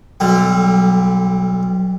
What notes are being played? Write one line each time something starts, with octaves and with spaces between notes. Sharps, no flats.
B1 D3 G3